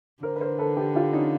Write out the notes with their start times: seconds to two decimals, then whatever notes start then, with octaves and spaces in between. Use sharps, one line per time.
0.22 D3 A#4 C5
0.36 B4
0.41 A#4 C5
0.59 A4 B4
0.77 G4 A4
0.95 F4 G4
1.13 C#4 D#4